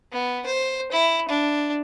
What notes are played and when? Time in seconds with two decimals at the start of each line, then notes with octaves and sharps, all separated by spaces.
0.13 B3
0.46 C5
0.92 E4
1.28 D4